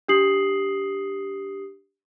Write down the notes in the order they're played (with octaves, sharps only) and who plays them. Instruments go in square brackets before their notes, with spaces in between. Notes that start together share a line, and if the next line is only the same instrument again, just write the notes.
[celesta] D4 G4 D#6 C7 F#7